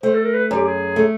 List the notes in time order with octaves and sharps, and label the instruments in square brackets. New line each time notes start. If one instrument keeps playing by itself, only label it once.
[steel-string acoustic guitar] A3 [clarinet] C5
[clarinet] A4
A#4
B4
[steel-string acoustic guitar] F#2 [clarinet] G4
[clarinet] G#4
[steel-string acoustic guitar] A3